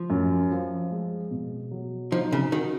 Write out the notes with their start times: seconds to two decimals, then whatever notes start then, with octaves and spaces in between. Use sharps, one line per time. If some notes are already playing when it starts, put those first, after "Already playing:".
Already playing: F3
0.10 F#2
0.51 F3
0.91 G#3
1.31 B2
1.71 F#3
2.12 F3 D#4
2.33 C#3
2.52 D#3 F#4